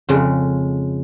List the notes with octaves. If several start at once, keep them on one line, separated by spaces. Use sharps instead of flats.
F2 C#3 G#3